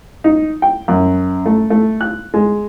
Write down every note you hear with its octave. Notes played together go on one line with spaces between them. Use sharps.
D#4
G5
F#2
A3
A3
F#6
G#3